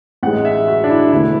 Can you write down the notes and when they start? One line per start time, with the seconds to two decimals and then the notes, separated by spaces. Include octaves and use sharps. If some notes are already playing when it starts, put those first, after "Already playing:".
0.23 A1 G#2 G#3 F#5
0.45 E5
0.68 F#4
0.84 D4
0.90 E4
1.12 E1 E2 D3 A3 E4